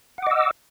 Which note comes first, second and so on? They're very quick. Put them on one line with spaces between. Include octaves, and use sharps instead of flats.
F#5 D6 D#5 E6